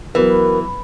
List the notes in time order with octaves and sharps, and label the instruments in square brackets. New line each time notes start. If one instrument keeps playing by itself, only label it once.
[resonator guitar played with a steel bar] E3 [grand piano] F#3 B3 [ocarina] A#4